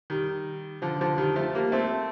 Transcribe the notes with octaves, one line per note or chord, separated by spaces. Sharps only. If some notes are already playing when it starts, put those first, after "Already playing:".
D#3 G3
D3 F3
D3 F3
D#3 G3
F3 A3
G3 A#3
A3 C4